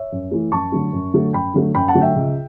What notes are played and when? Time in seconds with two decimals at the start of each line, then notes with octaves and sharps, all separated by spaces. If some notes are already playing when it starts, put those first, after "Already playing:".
Already playing: C#5 E5
0.12 F#2
0.31 E3 A3
0.52 F#2 A5 C#6
0.72 D3 F#3 A3
0.93 F#2
1.14 D3 F#3 A3
1.33 F#2 G5 B5
1.54 D3 F#3 A3
1.75 F#2 G5 B5
1.88 F#5 A5
1.94 D3 F#3 A3
2.01 E5 G5
2.16 C#2